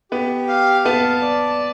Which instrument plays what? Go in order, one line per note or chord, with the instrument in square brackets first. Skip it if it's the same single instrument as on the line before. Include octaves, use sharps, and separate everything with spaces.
[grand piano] B3 [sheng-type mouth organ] G4
[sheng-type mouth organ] F5
[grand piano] B3 [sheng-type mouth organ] A5
[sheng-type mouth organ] D5